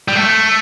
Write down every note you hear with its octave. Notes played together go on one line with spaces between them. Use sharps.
G3
A3